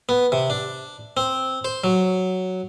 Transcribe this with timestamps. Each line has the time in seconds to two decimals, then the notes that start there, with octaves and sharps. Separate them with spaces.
0.09 B3
0.32 C3
0.50 D4
1.17 C4
1.65 C5
1.84 F#3